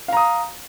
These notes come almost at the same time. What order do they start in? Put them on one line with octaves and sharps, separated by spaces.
F5 A#5 D#6